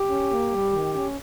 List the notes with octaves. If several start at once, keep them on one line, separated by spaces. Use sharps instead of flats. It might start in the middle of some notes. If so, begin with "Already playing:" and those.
Already playing: G4
C#4
A#3
G3
D#3
C#4